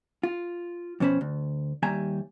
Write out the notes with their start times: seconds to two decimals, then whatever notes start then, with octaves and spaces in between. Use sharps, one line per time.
0.23 F4
1.00 F2 B2 C#4 C5 B5
1.21 D2
1.83 D#2 G3 E5 G#5 A#5